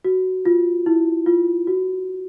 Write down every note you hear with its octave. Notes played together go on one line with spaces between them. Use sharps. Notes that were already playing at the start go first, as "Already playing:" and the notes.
F#4
F4
E4
F4
F#4